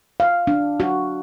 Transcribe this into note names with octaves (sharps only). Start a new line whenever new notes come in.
F5
D4
F#4